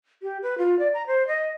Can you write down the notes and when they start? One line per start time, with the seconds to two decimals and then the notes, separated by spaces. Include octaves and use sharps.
0.22 G4
0.43 B4
0.58 F4
0.79 D5
0.94 A#5
1.07 C5
1.27 D#5